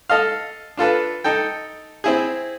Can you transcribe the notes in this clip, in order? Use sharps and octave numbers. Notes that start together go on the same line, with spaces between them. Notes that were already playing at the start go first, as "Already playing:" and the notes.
A4 D#5 F5
D4 F4 A4 B4
D#4 A4 G5
C4 E4 G#4